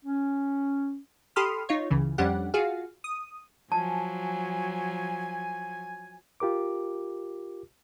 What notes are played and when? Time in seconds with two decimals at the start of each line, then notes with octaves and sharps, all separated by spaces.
0.05 C#4
1.36 G4 A4 B5 C6 D#6 F6
1.69 D#4 F4 C#5
1.91 C#2 C#3 E3
2.18 F2 G3 C#4 D4 G4 F#5
2.54 F4 F#4 G#4 F5
3.04 D#6
3.72 F3 F#3 G#5 A5
6.40 F4 G4 A#4 D6